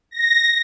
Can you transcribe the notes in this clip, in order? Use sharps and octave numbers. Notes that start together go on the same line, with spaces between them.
A#6